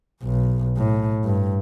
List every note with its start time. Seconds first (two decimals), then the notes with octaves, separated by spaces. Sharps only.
0.23 B1
0.77 A2
1.25 G2